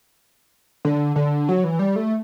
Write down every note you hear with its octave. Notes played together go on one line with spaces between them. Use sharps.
D3
D3
F#3
E3
G3
A3